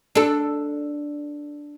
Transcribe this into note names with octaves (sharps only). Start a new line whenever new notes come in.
D4 A4